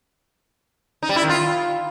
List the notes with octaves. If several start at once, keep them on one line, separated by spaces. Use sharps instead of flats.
D#4
G3
E4
D#3
F4